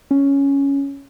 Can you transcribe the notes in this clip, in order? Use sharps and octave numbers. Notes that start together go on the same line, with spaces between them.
C#4